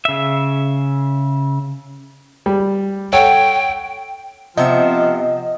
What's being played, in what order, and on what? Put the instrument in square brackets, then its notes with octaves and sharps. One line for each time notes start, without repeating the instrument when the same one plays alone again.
[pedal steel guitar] C#3 E5
[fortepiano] G3
[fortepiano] A4 C#5 F#5 [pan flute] G5
[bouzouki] C3 B3 E5 [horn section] F3 [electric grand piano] D#5